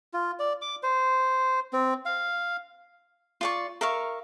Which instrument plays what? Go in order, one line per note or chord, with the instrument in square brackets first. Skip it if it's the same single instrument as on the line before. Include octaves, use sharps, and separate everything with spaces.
[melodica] F4
D5
D6
C5
C4
F5
[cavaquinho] F4 D5 C#6
A#4 E5 F5 C#6